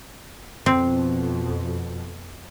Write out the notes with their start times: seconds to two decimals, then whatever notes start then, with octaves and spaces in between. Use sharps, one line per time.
0.66 F2 B2 C4